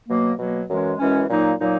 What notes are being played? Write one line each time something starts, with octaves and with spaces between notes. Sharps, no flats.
B2 F#3 A#3
B2 F#3 A#3
F#2 E3 G#3 C#4
F#2 E3 G#3 C#4
A#2 F#3 A#3 D#4
A#2 F#3 A#3 D#4